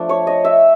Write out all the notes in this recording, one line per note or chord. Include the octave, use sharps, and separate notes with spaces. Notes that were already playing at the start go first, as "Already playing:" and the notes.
Already playing: F3 A3 D4
C#5
D#5
E5